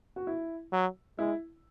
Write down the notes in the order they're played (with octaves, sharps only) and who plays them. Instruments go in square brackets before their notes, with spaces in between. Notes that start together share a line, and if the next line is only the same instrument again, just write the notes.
[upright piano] F#4
E4
[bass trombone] F#3
[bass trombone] G#3 [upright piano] E4